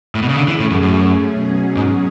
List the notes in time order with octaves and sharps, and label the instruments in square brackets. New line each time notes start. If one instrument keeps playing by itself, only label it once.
[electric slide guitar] A2
B2
C#3
[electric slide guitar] D3 [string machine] A3 C#4 G#4
[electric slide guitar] E3
A2
F#2
F#2
[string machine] B2 F#3 C#4 G#4
[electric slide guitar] G#2